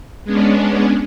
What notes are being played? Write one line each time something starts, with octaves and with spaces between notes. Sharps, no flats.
G#3 B3 C#4 D4